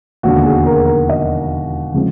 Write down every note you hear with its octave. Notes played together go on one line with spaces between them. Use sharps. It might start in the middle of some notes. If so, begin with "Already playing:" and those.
E1 D#2 D3 F#4
G#4
A#4
A#4
D#5
C#3 F3 G#3 C4